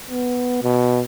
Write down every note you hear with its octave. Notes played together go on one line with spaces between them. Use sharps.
B3
B2